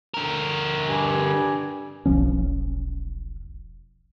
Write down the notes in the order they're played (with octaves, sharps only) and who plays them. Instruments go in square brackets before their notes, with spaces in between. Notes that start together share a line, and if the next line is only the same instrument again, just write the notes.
[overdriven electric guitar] D3 A#4
[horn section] G2 G3 G#5
[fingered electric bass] E1 B1 F3 C#4